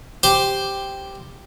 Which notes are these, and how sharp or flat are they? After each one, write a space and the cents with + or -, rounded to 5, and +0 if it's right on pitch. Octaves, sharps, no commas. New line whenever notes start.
G4 +0 C5 +0